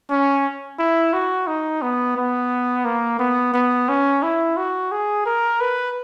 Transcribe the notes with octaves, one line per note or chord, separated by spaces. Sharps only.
C#4
E4
F#4
D#4
B3
B3
A#3
B3
B3
C#4
E4
F#4
G#4
A#4
B4